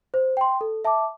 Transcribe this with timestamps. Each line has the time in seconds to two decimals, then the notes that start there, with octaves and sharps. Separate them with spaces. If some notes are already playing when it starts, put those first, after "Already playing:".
0.14 C5
0.37 G5 C6
0.61 A4
0.85 E5 A5 D6